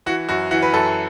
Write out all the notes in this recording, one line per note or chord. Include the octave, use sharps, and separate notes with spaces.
E3 F#4
F#2 F#4
E3 F#4
B4
F#2 A4